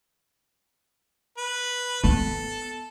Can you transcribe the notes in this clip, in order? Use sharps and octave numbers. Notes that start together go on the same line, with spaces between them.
B4
B3 A4